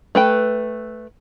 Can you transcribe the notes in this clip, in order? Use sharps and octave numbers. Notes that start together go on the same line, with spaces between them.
A3 B4 G5